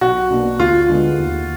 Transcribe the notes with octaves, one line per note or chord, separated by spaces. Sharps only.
B1 F#4
B2 A#3 D4
D2 F4
D3 G#3 B3
D#2